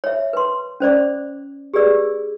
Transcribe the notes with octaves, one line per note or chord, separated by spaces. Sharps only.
C#5 E5
B4 C6
C#4 C5 D5 D6
G4 G#4 B4 D5 E6